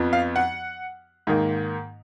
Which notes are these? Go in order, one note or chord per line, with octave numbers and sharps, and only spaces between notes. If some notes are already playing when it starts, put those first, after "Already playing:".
Already playing: F2 F3 B3
F5
F#5
G#2 D#3 A#3